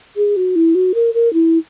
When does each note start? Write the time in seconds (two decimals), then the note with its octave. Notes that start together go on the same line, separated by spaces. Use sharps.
0.16 G#4
0.36 F#4
0.56 E4
0.75 F#4
0.94 A#4
1.14 A#4
1.33 E4